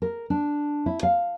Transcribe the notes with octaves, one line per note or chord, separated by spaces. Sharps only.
A#4
D4
E4
F5